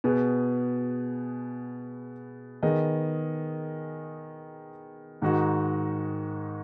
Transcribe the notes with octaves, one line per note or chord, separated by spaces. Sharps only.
B2 B3 G#4 B4
D#3 B3 G#4 D#5
G#2 D#3 G#3 D#4 F#4